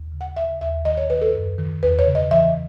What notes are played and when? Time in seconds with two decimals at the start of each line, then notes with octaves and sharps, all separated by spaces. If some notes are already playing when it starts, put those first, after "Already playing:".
Already playing: D#2
0.12 C#3
0.21 F#5
0.37 C#3 E5
0.61 D#2 E5
0.85 D#3 D#5
0.97 C#5
1.10 D#3 B4
1.21 A4
1.34 F#2
1.58 D#3
1.83 E2 B4
1.99 C#5
2.07 C#3
2.15 D#5
2.31 E3 E5